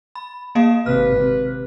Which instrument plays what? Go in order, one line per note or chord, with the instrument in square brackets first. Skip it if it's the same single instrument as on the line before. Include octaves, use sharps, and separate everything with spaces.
[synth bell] B5
A#3 D#5 F5
[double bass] G#1 C3 [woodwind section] B4 [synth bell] F6
[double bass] C3